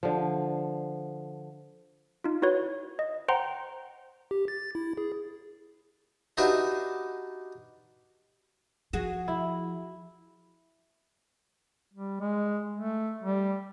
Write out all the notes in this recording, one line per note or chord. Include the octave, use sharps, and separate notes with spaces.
D3 F3
D#4 F4
E4 F#4 B4 C#5
D#5
C5 F#5 G5 A#5 C6
G4
A6
E4
G#4
D4 D#4 F#4 G4 B4 E5
F3 F#4 G#4
E4
G3
G#3
A3
G3